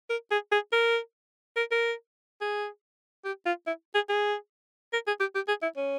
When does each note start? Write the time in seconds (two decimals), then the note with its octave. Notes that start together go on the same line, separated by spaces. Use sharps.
0.10 A#4
0.31 G#4
0.52 G#4
0.73 A#4
1.56 A#4
1.72 A#4
2.41 G#4
3.25 G4
3.46 F4
3.67 E4
3.94 G#4
4.09 G#4
4.93 A#4
5.07 G#4
5.20 G4
5.35 G4
5.48 G#4
5.62 E4
5.77 C#4